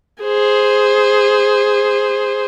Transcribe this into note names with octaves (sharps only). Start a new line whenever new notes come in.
G#4 C5